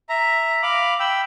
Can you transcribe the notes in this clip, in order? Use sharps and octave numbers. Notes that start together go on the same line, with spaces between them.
E5 A#5
F5 B5 D6
G5 B5 E6